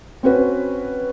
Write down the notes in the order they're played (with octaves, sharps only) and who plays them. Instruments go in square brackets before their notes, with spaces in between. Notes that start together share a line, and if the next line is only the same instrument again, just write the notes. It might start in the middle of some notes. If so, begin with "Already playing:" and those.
[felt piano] C4 C#4 F#4 B4